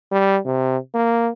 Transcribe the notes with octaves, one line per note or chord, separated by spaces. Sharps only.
G3
C3
A#3